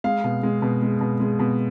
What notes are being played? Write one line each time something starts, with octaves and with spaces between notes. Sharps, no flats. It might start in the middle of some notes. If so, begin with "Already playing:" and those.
G#3 F5
B2
G#3
B2
G#3
B2
G#3
B2